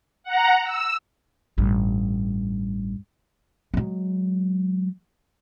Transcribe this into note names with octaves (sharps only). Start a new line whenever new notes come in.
F#5 A#5
E6
A1 G2
F#3 G#3